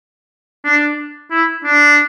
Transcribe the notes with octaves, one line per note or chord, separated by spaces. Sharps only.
D4
E4
D4